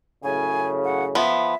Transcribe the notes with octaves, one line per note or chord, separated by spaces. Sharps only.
F#2 A2 C#3 G#5
F#5
F3 B3 E5